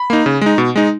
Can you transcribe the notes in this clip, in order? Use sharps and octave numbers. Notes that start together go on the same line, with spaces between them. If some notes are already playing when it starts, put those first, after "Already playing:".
Already playing: B5
A#3 D#4
C#3
G#3 D#4
B2
G#3 D#4